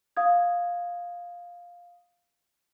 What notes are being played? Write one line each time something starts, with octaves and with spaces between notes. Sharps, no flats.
F5 D#6 G#6